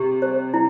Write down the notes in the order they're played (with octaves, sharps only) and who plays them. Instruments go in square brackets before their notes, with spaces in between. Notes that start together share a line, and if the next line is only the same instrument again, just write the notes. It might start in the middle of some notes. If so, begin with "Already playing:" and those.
Already playing: [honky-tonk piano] C3 [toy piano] G4
[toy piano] C5
E4